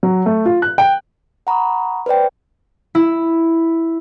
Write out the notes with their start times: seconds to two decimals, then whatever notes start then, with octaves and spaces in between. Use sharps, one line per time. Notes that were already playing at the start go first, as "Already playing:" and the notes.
0.03 F#3
0.26 A3
0.46 F4
0.62 F#6
0.78 G5
1.47 F#5 A#5 B5 C#6 D#6
2.06 B4 C5 D5 G5
2.95 E4